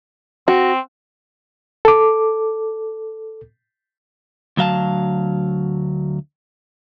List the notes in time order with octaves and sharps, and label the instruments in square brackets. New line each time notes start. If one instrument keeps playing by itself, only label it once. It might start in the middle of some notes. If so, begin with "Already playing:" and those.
[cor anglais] C4 [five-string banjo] F#4
[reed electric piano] A4 D6
[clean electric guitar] D2 F#3 F5 A5